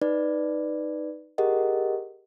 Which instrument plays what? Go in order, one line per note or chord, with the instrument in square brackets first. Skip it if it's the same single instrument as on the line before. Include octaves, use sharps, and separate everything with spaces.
[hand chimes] D#4 B4 D5
G4 G#4 A#4 D#5 F#5